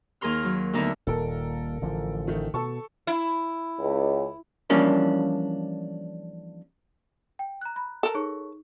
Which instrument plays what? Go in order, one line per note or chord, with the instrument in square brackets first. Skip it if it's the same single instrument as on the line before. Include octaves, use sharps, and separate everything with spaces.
[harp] D#2 G#4 A#4 C6 F6
F#3
D2 D3 B3 D#4 A#4 E5
[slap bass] D#1 D#2 A#2 [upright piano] A4 A#4
[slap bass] A1 D3 F3
[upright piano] D#3 A3 D#4
[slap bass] B2 [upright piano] A4 A5 C#6
[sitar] E4
[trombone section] C#2
[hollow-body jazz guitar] E3 F3 G3 A#3 C#4 D4
[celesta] G5
A#5 F#6
[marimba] B5
[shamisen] A4 A#4
[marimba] D#4 [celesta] G#4 C#5 C#6